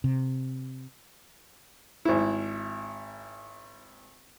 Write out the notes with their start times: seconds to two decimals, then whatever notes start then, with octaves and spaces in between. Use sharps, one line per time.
0.04 C3
2.05 G#1 E4